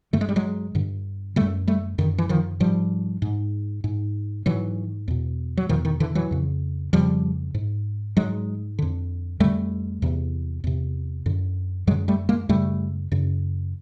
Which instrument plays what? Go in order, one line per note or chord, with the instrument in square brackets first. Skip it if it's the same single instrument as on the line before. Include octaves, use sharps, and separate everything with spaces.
[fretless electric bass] G2 D3 A3
G#3
G3
F#3 G#3
G2 D3
F#2 D3 G3 A3
G3 A3
F#2 D3 D#3
E3
D#3 F3
G#2 F3 G3
G#2
G#2
G#2 E3 F#3
E2 B2
F#3
E2 B2 D#3 F3
D#3
D3 E3
E3 F#3
F2 C#3
F2 C#3 F3 G3
G#2
G#2 F#3 G#3
F2 D3
F2 D3 G3 A3
E2 C3
E2 C3
F#2 D3
F#2 F#3 G#3
D3
G3 A3
G#3 A#3
F#2 C#3 G3 A3
F#2 C#3